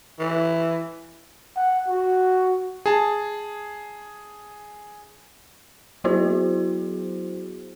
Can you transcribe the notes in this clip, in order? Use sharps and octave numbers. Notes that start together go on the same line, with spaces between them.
E3
F#5
F#4
G#4 A5
F#3 B3 E4 F#4 G#4 C5